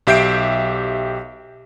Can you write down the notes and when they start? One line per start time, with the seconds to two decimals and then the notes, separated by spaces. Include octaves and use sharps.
0.07 B1 G4 E5 G6 C7 D7